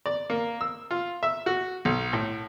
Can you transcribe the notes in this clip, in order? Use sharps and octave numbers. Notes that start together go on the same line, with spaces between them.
D5
A#3
E6
F4
E5
F#4
B1
A2